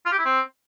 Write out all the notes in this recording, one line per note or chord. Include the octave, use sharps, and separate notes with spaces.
F4
G4
E4
C4